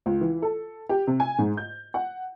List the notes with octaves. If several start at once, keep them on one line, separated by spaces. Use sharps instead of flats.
C#2
E3
A4
G4
C3
G#5
G#2
G6
F#5